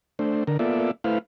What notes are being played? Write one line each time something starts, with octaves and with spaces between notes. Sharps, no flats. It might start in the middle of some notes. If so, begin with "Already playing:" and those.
A3 D4 C5
D3 A#4
A#3 B3 F4 A4 D5 E5
A3 E4 B4 C5 F5